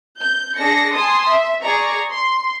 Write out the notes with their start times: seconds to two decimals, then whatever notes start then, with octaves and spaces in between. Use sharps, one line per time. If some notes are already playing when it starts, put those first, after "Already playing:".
0.19 G6
0.57 D4 G#4 A#6 C#7
0.95 G#5 A5 C6 D#6
1.27 E5
1.63 G#4 D5 A#5 C#6
2.10 C6